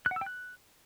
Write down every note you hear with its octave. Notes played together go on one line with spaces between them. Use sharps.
F#6
F#5
E6
G5
F#6